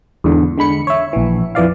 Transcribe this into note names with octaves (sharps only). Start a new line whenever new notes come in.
E2 G#2 D3
D3 G#3 B5 C#7
C#5 E5
A#1 E3
F2 E3 D5 F5